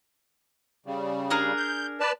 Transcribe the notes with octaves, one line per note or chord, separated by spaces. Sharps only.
C#3 G3
D4 G#4 A#4
G6
B4 D5 A5